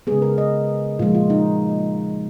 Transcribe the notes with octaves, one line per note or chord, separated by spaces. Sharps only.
C#3 G#3 B3 G#4
A#4
D#5
A#2 F3 G#3 F4
F4
D#4